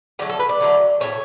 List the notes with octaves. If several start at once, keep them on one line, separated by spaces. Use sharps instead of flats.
D3 F#3 A3 G4
A4
B4
D5
D3 F#3 A3
A2 F#3 A3 C#5